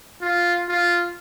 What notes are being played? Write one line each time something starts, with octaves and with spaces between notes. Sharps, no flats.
F4
F4